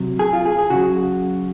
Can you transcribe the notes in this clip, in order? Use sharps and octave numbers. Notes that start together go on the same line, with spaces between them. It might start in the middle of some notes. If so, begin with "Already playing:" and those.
Already playing: C3 F#3
G#4
F4
G#4
G#4
C#3 F#3 F#4